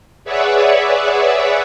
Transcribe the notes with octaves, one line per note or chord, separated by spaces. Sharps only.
G#4 B4 C#5 D5 E5 F#5